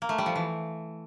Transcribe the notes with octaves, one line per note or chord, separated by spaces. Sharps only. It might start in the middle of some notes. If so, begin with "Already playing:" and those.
A#3
A3
G3
F3
E3